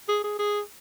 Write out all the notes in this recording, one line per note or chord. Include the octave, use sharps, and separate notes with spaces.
G#4
G#4
G#4